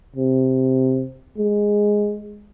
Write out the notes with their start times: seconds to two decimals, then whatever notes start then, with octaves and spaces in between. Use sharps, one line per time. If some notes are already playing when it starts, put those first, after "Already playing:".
0.16 C3
1.38 G#3